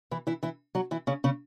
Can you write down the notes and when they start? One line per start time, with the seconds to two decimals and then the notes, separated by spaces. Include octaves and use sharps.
0.11 E3 E4
0.27 E3 E4
0.43 E3 E4
0.75 F#3 F#4
0.91 E3 E4
1.07 C#3 C#4
1.24 C#3 C#4